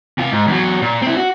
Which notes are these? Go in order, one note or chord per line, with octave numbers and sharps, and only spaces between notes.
C3 F4
G#2
E2 F#3
A#2
C4 E4
F#4